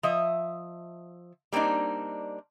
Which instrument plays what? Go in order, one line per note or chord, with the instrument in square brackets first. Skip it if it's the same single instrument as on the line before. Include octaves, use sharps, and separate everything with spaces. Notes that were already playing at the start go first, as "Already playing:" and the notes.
[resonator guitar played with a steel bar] F3 D#5 E5
G3 A#3 C4 D4 D#4